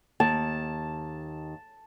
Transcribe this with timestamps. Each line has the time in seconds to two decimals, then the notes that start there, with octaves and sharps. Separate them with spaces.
0.20 D#2 A5